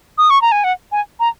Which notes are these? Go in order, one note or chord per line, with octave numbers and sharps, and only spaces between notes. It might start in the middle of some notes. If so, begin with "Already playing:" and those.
D#6
C#6
A#5
G#5
F#5
G#5
A#5